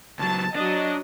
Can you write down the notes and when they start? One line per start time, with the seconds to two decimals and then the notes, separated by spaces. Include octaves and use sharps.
0.19 C#2 F#3 A5
0.56 F#3 D4 D#5